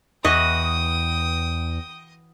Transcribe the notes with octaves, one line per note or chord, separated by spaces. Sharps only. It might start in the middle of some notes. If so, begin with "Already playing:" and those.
E2 E3 F#4 B4 D#5 G5 D#6